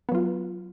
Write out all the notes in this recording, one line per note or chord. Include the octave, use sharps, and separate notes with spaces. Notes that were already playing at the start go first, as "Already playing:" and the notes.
F#3 B3 F4